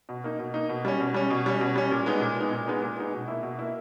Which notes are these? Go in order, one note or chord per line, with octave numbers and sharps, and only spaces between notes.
B2
A#3 D#4
B2
A#3 D#4
B2
G3 C#4
B2
G3 C#4
B2
G3 C#4
B2
G3 C#4
A#2
G#3 B3 D#4
A#2
G#3 B3 D#4
A#2
G#3 B3 D#4
A#2
G#3 B3 D#4
B2
A#3 E4
B2
A#3 E4